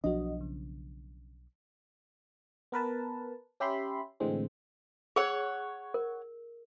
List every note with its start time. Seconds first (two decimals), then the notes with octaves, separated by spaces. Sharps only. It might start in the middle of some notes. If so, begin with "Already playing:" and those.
0.04 B1 F3 D4 F#4 D#5
0.41 C#3
2.72 B3 A#4 B4 A5
3.60 C#4 G4 E5 B5 C6
4.20 A2 D3 E3 G#3 C4
5.16 G#4 C#5 F#5 E6
5.94 A#4